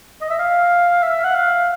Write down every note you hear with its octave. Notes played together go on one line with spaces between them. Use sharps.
D#5
E5
F5
E5
F#5
F5